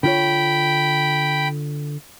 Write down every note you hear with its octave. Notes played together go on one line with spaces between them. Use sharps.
D3 F4 C#5 G5 B5